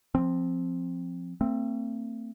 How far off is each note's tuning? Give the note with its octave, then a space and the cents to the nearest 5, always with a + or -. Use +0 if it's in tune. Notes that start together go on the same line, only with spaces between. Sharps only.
F3 +0 C4 +0
A3 +45 C4 +0